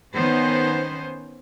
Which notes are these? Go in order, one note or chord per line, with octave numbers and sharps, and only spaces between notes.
D#3 B3 C#4 C5